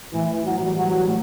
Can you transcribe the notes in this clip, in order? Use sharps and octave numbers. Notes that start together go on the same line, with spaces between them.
A2 E3
F#3
E3 G3
F#3
A2